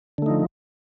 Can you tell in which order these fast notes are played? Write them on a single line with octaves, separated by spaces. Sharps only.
D3 A3 D#4 F3